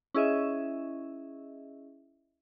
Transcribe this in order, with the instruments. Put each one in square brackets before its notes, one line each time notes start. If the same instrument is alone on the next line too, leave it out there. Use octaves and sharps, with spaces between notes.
[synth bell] C#4 E4 G#4 D#5 E5